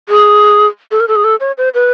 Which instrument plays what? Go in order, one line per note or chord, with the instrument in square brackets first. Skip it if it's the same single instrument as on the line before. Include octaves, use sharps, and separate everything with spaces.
[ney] G#4
A4
A#4
A4
G#4
A4
C#5
C5
B4